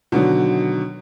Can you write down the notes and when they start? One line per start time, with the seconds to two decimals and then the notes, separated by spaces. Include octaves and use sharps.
0.12 B2 D3 D#3 F#3